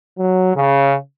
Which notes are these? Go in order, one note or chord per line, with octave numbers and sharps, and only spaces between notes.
F#3
C#3